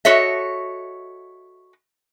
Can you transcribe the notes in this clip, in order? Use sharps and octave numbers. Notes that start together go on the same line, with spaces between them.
F#4 A4 C#5 D#5 E5